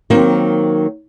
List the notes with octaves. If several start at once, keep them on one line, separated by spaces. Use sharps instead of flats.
D#3 F#3 A#3 C4